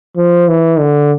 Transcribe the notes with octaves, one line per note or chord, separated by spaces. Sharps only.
F3
E3
D3